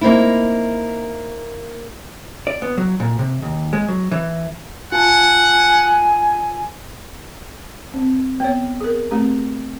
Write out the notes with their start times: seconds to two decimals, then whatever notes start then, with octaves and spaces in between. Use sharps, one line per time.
0.01 A#3 C4 D#4 E4
2.47 D5
2.62 B3
2.77 F#3
3.00 A#2
3.19 C3
3.42 D#2
3.73 G#3
3.88 F#3
4.11 E3
4.92 F4 F#5 G#5 A5
7.94 C4
8.40 B3 C#5
8.81 G#4 A#4
9.11 A3 C4 G4 A#5